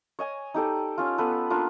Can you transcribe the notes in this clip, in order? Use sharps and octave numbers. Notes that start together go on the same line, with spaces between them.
C#5 D#5 G#5
D#4 G4 A4 D5
C#4 F4
B3 A4 B4
A#3 D4 F4 B4